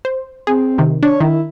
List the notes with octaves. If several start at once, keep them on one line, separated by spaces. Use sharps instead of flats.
C5
C4 G#4
C3 D#3
D4 C#5
D#3 E4